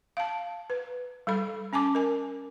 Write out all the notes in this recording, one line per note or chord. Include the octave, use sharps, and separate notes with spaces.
F5 A5
B4
G3 A4 B5
C#4 G#5 A5 D6
A#4 G#5